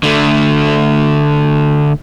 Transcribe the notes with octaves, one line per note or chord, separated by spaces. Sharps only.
D3 A3